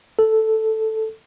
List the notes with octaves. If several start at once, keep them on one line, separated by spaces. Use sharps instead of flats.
A4